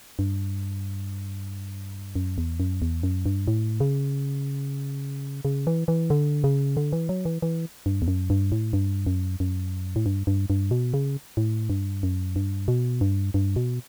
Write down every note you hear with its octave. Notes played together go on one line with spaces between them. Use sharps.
G2
F#2
E2
F#2
E2
F#2
G2
A2
C#3
C#3
E3
E3
D3
C#3
D3
E3
F#3
E3
E3
G2
E2
F#2
G2
A2
G2
F#2
F#2
A2
G2
G2
G2
B2
C#3
A2
G2
F#2
G2
B2
G2
G2
B2